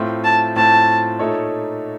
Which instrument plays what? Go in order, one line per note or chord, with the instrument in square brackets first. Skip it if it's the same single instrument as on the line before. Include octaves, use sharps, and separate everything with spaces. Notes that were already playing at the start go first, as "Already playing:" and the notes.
Already playing: [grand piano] A2 A3 C4 F4
[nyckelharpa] A5
[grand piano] A2 A3 C4 F4 [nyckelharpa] A5
[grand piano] A#2 A3 D#4 A4 C#5